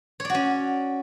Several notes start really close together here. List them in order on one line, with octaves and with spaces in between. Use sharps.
C#5 D5 F#4 C#4